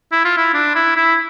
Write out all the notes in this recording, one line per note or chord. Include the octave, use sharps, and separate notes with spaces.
E4
F4
E4
D4
E4
E4